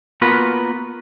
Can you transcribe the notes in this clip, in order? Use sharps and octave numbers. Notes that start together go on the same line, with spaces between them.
A#3 B3 F4 F#4 A#4 B4